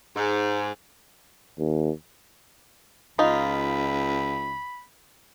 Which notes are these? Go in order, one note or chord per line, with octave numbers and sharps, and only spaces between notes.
G#2
D#2
C#2 D#4 F4 B5